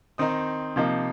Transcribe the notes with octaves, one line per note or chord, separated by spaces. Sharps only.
D#3 C4 D#4 D#6
C3 F3 A#3 D#4